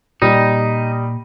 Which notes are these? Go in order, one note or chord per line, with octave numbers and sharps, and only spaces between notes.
A#2 G3 D#4